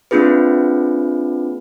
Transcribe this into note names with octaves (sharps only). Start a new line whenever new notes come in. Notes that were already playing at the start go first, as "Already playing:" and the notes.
A#3 C4 D4 F4 G#4 B4